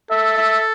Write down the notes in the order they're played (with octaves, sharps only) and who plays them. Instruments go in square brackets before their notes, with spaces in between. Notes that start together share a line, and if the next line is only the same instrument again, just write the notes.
[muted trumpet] A4 [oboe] E5
[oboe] E5